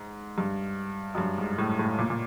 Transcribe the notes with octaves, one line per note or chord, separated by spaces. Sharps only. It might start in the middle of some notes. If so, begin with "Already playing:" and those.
Already playing: G#2
G2
F#2
G2
G#2
A2
A2
A#2
A#2